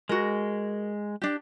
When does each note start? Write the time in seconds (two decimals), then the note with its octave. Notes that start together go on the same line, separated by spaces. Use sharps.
0.09 G#3 F#4 A#4
1.22 D4 G4